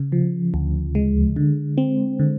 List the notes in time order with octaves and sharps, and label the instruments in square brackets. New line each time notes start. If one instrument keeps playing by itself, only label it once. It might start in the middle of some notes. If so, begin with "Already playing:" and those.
Already playing: [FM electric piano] C#3
F3
D2
G#3
D3
C4
D3